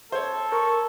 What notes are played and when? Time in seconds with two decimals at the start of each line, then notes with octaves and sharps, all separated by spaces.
0.12 A4 C5 C#5
0.52 A#4 C#6